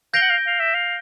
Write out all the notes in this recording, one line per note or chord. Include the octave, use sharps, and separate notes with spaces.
F5 G6 A#6 D7 G7
F#5
F5
F5
E5
F5